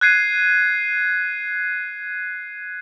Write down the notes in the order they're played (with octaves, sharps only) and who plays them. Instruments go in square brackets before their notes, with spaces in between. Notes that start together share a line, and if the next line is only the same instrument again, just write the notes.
[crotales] F#6 G#6 C7 D#7